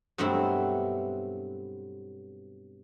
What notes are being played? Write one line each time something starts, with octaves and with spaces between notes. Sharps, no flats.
G2 B2 F#3 A3 C4 E4